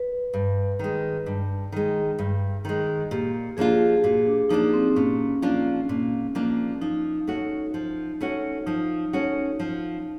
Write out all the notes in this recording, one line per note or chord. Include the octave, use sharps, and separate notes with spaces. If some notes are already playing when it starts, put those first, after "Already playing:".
Already playing: B4
G2
D#3 G#3
G2
D#3 G#3
G2
D#3 G#3
A#2 G4
F3 A#3 D4 F4 G#4
A#2 F#4
D4
F3 A#3 D4 D#4 F4
C4
A#2 C#4
F3 A#3 D4 F4
A#2
F3 A#3 D4 F4
F3 D#4
A3 C#4 F#4
F3
A3 C#4 F#4
F3 D#4
A3 C#4 F#4
F3